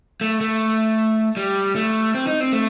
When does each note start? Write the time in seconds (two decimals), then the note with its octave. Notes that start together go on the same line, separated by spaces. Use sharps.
0.21 A3
0.41 A3
1.37 G3
1.76 A3
2.15 C4
2.27 D#4
2.41 C4
2.53 A3